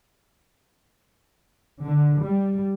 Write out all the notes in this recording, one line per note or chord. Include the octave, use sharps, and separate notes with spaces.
D3
G3